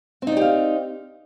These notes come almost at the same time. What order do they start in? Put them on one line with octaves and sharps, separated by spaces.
C4 D#4 D5 G4 F5